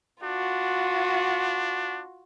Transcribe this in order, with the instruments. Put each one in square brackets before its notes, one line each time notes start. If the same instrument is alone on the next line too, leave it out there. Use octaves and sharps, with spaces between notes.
[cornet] D4 [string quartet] F4 F#4